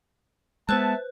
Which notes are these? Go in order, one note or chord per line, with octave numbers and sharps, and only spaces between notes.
G#3 B3 B4 C5 E5 A5 F#6